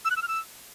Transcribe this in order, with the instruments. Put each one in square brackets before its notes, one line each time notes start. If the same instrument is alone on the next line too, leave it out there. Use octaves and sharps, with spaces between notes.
[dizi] E6
F#6
E6
F6
E6